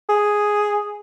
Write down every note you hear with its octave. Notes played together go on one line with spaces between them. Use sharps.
G#4